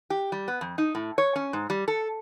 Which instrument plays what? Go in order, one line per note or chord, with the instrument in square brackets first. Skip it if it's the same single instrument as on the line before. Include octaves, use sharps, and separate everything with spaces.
[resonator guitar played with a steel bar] G4
G3
B3
F2
D#4
A2
C#5
C#4
G#2
G3
A4